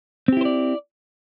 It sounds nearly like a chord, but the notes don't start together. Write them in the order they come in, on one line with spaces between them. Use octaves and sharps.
C4 G4 E4 C5 D5